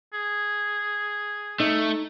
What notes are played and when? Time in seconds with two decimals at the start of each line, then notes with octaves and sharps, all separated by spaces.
0.14 G#4
1.60 A3 D#4